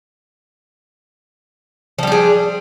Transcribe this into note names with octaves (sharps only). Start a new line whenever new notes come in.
F3 G3 D4 G#4